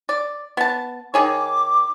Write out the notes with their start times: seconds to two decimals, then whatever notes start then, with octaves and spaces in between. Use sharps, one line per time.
0.09 D5
0.57 B3 A5
1.14 D#3 G#4 C#5 D6